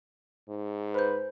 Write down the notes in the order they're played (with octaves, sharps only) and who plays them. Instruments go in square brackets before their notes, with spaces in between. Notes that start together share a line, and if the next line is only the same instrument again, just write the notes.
[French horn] G#2
[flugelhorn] B4 [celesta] C5 G6